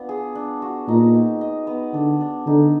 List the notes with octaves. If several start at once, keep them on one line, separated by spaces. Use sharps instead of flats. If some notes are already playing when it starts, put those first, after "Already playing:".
Already playing: B3 D4 F4
G#4
D4
F#4
A#2 D#4
D#4
D#5
B3
D3 D4
D4
D3 D#4